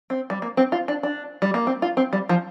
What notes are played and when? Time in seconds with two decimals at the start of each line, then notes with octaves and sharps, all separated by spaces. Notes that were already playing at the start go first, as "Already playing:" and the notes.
0.10 C4
0.30 G3
0.42 A#3
0.57 C4
0.72 F4
0.88 D4
1.03 D4
1.42 G3
1.54 A#3
1.67 C4
1.82 F4
1.97 C4
2.13 G3
2.29 F3